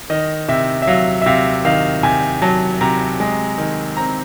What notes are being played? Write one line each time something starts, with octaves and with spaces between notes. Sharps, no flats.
D#3 D#5
C3 E5
E5
F#3 F5
E5
C3 F5
D#3 F5
C3 G#5
F#3 A5
C3 A#5
G#3
D#3
C4 A#5